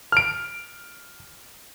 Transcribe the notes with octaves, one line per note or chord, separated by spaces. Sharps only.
F6 D7